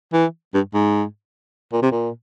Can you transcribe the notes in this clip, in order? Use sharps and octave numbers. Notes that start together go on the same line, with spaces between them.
E3
G2
G#2
A#2
C3
A#2